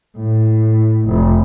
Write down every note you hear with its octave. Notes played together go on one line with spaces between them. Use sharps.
A2
F1